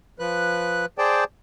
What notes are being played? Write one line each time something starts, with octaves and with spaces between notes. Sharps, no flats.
F3 B4 F#6
G#4 C5 D5 G5 A5